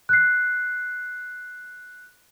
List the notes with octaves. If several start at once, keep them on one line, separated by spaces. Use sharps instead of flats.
F#6 C7